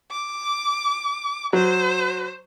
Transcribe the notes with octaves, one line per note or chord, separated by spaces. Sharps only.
D6
F#3 C5